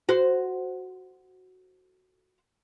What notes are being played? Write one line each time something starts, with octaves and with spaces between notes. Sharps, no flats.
F#4 C5